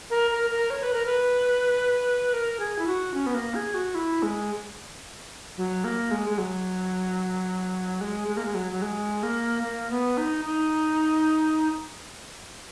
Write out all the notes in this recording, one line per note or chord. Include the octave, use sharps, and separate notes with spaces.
A#4
A#4
A#4
C#5
B4
A#4
B4
A#4
G#4
E4
F#4
C#4
B3
A#3
G#4
F#4
E4
G#3
F#3
A#3
G#3
G#3
F#3
G#3
G#3
A#3
G#3
F#3
F#3
G#3
A#3
A#3
B3
D#4
D#4